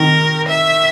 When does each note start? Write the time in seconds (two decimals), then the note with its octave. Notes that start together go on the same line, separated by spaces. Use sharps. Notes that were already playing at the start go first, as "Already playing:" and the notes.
Already playing: D#3 A#4
0.48 E5